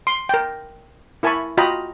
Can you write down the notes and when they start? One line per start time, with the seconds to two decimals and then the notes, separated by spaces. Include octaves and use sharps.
0.07 C6
0.29 A#4 G5
1.23 E4 A#4 G#5 A5 B5 C#6
1.58 F4 F#4 D#5 G5 A#5 B5